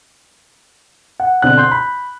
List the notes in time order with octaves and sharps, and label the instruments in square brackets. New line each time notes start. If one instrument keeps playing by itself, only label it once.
[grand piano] F#5
B2 D3 C4 F#6
C6 G6
B5